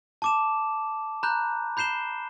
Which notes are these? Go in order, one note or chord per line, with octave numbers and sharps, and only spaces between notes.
A5 D6 E7
A#5 B5 F#6 G6
B5 G6 C7 E7 G7